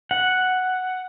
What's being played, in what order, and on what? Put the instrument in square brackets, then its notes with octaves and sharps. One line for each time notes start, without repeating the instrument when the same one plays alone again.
[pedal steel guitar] F#5